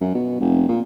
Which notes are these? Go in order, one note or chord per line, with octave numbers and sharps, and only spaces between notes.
F#2
B2
F1
A#2